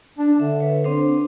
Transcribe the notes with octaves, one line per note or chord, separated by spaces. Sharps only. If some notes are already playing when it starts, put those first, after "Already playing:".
D4
D3 E5
B4 C#5
C4 D4 C5